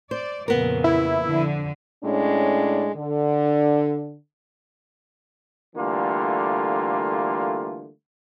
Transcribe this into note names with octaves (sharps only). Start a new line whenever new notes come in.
C5 D5
F2 A#2 C#3 B3 A#4
E4
F2 D3
A2 G#3 C#4 D4
D3
D3 E3 G3 A3 A#3 F4